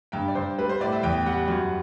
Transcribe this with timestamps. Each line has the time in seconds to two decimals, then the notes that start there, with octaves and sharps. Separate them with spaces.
0.12 G2 G5
0.28 D5
0.35 G2 C5
0.58 G3 B4
0.69 C5
0.80 A2 D5
0.92 E5
1.03 E2 G5
1.26 G3 F#5
1.48 F#2